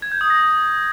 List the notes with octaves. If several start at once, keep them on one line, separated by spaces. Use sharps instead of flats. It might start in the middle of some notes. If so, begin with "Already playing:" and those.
G#6
G6
D#6
A#6